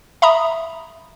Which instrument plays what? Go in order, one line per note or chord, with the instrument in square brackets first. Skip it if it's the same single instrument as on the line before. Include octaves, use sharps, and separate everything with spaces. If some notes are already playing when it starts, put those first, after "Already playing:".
[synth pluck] E5 A#5 B5 D#6